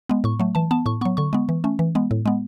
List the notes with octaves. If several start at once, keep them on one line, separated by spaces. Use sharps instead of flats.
G#3 B3
A2 C#6
F#3 A3
E3 A5
B3 A5
A2 C#6
F#3 B3 C#6
D3 C#6
G#3 B3
E3
A3 C#4
E3
G#3 B3
A2
G#3 B3